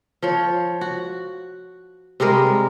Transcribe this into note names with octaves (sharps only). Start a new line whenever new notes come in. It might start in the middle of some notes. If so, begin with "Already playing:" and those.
F3 C#5
F#4
C3 G3 G#3 A#4